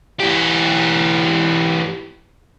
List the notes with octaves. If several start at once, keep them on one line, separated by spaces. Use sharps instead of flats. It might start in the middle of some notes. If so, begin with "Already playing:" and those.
E3 G4